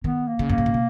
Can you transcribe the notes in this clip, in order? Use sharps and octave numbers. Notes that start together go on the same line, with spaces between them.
D#3 B3
A#3
C#3
F#2 A#3
G#2
A#2
B2